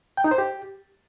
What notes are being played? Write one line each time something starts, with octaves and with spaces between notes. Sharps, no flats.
G5
D#4
C5
G4